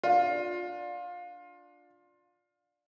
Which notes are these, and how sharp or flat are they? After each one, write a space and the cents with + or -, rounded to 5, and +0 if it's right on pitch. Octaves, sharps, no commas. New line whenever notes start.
D4 +0 F4 +20